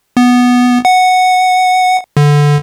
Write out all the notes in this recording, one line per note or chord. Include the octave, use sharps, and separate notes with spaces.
B3
F#5
D3